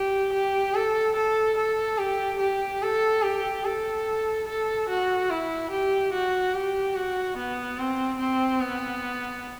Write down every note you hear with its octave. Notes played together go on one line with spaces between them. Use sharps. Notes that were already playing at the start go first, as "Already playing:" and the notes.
Already playing: G4
G4
A4
A4
A4
G4
G4
A4
G4
A4
A4
F#4
E4
G4
F#4
G4
F#4
B3
C4
C4
B3